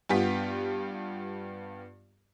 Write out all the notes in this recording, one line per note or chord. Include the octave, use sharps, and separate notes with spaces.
G2 B3 F4 G4 B6